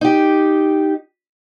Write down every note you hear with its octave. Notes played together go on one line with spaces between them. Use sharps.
D#4 G4